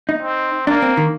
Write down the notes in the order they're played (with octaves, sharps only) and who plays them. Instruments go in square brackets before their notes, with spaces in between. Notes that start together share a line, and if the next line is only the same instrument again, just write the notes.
[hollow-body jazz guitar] D#4
[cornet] C4
[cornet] A#3 [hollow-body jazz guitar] D4
[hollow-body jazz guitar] C4
D#3